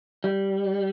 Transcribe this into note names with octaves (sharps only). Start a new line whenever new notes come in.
G3